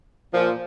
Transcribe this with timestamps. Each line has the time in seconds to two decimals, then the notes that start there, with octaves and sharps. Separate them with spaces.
0.33 A#2 F3